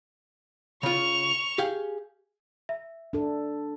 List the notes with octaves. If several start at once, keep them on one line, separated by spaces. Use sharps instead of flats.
C#3 F4 C#6 F7
G4 G#4 F5
E5
D4 A4